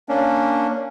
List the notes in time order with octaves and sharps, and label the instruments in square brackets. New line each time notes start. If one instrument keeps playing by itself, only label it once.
[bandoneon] A#3 C#4 D4